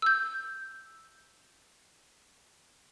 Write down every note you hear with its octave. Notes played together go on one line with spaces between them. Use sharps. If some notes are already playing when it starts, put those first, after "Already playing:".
E6 G6